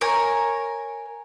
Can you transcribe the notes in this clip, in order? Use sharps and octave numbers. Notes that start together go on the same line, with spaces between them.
A#4 C#5 G#5